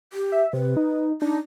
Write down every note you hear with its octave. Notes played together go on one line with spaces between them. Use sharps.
G4
E5
C3 B4
D#4
D4 D#4